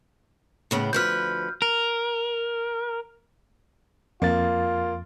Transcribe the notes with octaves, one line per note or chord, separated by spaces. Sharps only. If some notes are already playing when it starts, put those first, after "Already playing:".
A2 C#3 B3
D2 F3 B4 F6 G6
A#4
F2 A#3 F4 A6